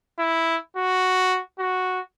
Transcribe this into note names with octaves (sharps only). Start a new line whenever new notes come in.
E4
F#4
F#4